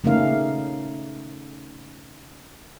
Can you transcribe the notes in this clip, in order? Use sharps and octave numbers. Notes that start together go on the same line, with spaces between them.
C#3 A3 A#3 C#4 D#4 F5